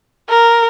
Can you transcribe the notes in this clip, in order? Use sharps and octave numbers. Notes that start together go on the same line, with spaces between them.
A#4